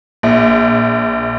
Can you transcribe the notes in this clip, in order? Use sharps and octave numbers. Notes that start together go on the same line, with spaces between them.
A#1